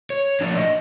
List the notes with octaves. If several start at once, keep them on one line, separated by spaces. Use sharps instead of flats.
C#5
A2 F3 A#3 D4 D5
D#5